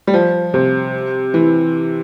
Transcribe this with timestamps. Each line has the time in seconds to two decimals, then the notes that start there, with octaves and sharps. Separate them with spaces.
0.07 G3
0.14 F3
0.54 C3
1.34 E3